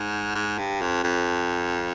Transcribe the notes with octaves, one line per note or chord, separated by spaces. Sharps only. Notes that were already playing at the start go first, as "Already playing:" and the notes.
Already playing: G#2
G#2
G2
F2
F2